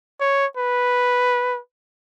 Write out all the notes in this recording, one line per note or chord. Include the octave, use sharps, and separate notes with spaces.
C#5
B4